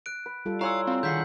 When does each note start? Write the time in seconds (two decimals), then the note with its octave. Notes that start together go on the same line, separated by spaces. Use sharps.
0.06 F#6 D7
0.26 B4
0.46 G3 F4 A4
0.61 E4 C#5 F5 G#5 A#5 C6 C#6 E6
0.87 C4 F4 B5
1.03 D3 D#3 G#4 F#5 G6 B6 C7